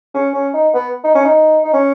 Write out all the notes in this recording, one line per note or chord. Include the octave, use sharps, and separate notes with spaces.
C#4
C#4
D#4
B3
D#4
C#4
D#4
D#4
C#4